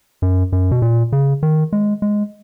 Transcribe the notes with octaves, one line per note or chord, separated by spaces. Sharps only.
F#2
F#2
B2
A#2
C#3
D#3
G#3
G#3